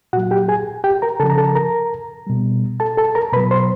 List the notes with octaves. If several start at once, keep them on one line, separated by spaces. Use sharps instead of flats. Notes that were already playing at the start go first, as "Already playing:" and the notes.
A#2 F#3 F#4 F#5
G4 G5
G#4 G#5
G4 G5
A#4 A#5
C#3 F3 A4 A5
A#5
A4 A5
A#4 A#5
B2 G3
A4 A5
A4 A5
A#4 A#5
B2 F#3 B4 B5
C5 C6